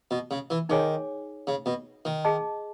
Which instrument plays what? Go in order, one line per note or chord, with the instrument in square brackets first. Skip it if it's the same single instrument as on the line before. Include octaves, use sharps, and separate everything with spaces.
[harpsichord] B2
C#3
E3
[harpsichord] D#3 [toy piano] D#4 G#4 C#5 G#5
[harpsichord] C#3
B2
D#3
[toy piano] G#4 D#5 A5